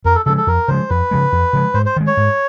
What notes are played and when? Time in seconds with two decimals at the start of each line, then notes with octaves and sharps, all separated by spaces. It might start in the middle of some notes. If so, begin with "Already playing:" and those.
0.05 F2 A#4
0.16 A4
0.26 C#3 F3 G#3 A4
0.37 A4
0.47 F2 A#4
0.68 C#3 F3 G#3 C5
0.90 F2 B4
1.11 C#3 F3 G#3
1.32 F2
1.53 C#3 F3 G#3
1.74 G#2 C5
1.86 C5
1.96 D#3 G#3
2.07 C#5
2.17 G#2